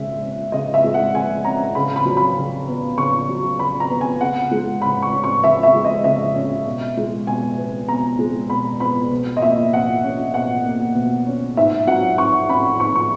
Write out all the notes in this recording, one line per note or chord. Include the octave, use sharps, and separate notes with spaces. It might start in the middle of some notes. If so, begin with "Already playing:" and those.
Already playing: C#3 G#3 E5
C#4
C#3 D#5
E5
G#3
F#5
C#3 G#5
C#4 A#5
C#3 B5
B5
F#3
B5
C#3
B3
C#3 C#6
F#3
C#3 B5
A#5
B3
G#5
C#3 F#5
G#3
C#3 B5
C#6
C#4
C#6
C#3 E5
E5
G#3
D#5
C#3 E5
C#4
B2
G#3
B2 G#5
B3
B2 A#5
G#3
B2 B5
B3 B5
B2
D#5
A#3 E5
B2 F#5
C#4
B2 F#5
A#3
B2
C#4
G#2 E5
F#3 F#5
G#2 C#6
C#4 B5
G#2 C#6
C#6